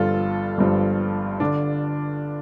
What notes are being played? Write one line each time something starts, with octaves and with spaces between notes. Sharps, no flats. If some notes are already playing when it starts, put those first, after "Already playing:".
Already playing: G1 G2 F3 F4 A4
G1 G2 F3
D3 D4